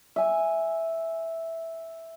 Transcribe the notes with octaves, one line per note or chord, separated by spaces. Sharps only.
E5 G#5